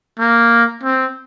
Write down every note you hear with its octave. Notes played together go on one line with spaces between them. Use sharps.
A#3
C4